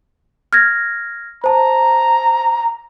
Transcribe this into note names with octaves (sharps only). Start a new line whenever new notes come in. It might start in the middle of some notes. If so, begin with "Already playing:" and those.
F6 G#6 A#6
C5 A5 A#5